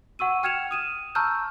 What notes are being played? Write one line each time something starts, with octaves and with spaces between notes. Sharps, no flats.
F#5 C#6 E6 D#7
G5 F6 G#6 C#7 E7 F7
D#6 D#7 E7
A5 A#5 C#6 E6 F6 G6